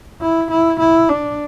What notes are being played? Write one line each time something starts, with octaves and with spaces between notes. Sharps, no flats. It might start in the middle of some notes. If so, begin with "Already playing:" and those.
E4
E4
E4
D4